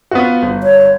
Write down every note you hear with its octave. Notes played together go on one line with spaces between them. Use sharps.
B3 F4 F#4
G1
C#5